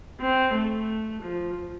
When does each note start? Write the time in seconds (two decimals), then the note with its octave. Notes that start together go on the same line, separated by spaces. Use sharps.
0.21 C4
0.54 A3
1.22 F3